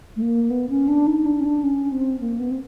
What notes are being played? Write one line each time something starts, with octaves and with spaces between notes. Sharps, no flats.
A3
A#3
B3
C#4
D4
D#4
D4
C#4
D4
C#4
C4
A#3
B3
C4